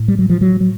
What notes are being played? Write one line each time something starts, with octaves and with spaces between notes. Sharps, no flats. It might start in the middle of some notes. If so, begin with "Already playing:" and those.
Already playing: A2
G3
F#3
F3
F#3
F#3